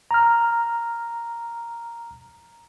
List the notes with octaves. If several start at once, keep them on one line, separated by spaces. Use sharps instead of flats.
A#5 F6